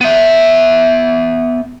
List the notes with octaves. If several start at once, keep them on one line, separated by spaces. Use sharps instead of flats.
B3 E5